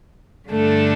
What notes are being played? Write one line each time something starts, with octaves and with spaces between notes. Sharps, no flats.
G2 D3 A3 D4 A4